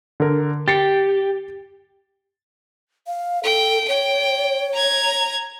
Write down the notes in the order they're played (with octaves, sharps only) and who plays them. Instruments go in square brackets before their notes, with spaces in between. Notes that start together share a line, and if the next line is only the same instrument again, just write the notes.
[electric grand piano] D3 A#4
[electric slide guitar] G4 [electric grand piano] A6 C7 C#7
[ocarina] F5
[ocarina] A4 [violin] G5
[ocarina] C#5 [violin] G5
[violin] A#5 G#6